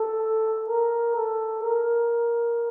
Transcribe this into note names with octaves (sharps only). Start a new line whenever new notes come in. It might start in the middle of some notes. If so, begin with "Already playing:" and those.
Already playing: A4
A#4
A4
A#4